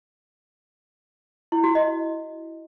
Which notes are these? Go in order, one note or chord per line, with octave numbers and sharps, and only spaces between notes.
E4
F#4
D#5